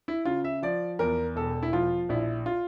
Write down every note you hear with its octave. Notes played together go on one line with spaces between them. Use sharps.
E4
C#3 F4
E5
F3 D5
E2 A#4
E1 A4
E4
F3 F4
A#1 E4
F4